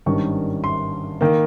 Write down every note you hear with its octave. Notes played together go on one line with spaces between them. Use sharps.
G#1 G2 D#3 G3 C#4 C#6
C6
D#3 A#3